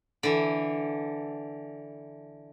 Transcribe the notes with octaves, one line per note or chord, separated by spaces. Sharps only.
D3 E3